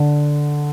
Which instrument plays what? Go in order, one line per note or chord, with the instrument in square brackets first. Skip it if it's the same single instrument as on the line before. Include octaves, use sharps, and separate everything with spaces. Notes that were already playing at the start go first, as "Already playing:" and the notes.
Already playing: [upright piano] D3